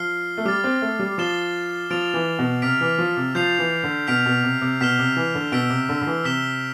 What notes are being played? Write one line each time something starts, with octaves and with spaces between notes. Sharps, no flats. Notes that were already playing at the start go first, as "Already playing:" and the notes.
Already playing: F3 F6 C7 G7
A3
G3 D6 F6 A6
C4
A3
G3
F3 D6 A6 C7 E7 G7
F3 A6 D7 F7
E3
B2
C3 F6 B6 D7 F7
E3
F3
C3
F3 G6 C7 F7
E3
D3
B2 F6 B6 D7 F7
B2
C3
C3
B2 F6 B6 E7 G7
C3
E3
D3
B2 E6 B6 D7 G7
C3
D3
D3
E3
C3 E6 B6 E7 G7